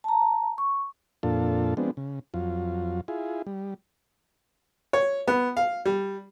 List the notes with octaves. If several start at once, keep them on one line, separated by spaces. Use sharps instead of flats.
A5 A#5
C#6
F2 A#2 D4 F4 A4
F3 G#3 B3 C4 D4
C#3
F2 F#3 F4
E4 F4 G#4
G3
C#5
B3
F5
G3